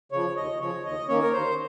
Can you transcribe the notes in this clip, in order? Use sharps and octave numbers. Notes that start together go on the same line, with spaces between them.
C#3 F3 C#5
D#2 D#5
C#3 F3 C#5
D#2 D#5
D#3 A#3 C#4 C#5
A#4
D#2 C5